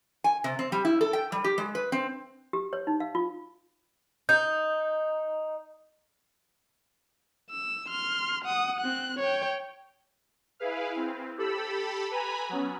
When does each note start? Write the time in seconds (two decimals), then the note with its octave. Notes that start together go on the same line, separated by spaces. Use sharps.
0.24 G#5
0.44 C3
0.59 C4
0.72 G3
0.85 E4
1.01 A4
1.13 G5
1.32 G3
1.44 G4
1.58 G#3
1.75 B4
1.92 C4
2.53 G4
2.73 C#5
2.87 D#4
3.00 F5
3.15 F4
4.29 D#4 G6
7.50 E6
7.88 C6 F6
8.45 F#5 D#6
8.80 C4 F#6
9.19 C#5 G5
10.60 E4 G#4 B4 F5
10.96 C4
11.38 G4 A4 B5 E6
12.11 B4 G#5 A#5 B5
12.49 F#3 B3 C#4